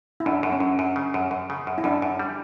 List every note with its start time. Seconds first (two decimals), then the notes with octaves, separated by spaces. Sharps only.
0.20 E4
0.26 F#2 D4
0.43 F#2
0.52 C#4
0.60 F#2
0.79 F#2
0.96 C#3
1.14 F#2
1.31 F#2
1.50 C#3
1.67 F#2
1.78 E4
1.84 F#2 D4
2.02 F#2
2.19 G3